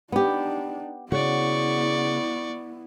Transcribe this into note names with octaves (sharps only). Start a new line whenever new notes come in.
B3 D4 D#4 G4
C#3 B3 E4 F#4 D5 C#6